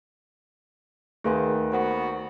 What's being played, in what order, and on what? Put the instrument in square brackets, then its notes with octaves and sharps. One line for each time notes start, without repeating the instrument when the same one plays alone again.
[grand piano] D2 D#3 [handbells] A3 B4 G#5 [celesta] G#4 F5 C6
[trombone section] A#3 B3 F#4 [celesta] C5 F#5 C#6